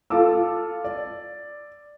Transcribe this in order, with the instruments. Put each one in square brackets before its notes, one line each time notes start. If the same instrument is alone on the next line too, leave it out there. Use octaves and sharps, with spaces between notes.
[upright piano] F4 A4 D6 E6
D5